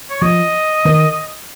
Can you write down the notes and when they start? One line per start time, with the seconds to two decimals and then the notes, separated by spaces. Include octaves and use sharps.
0.10 C#5
0.21 F3 D#5
0.85 D#3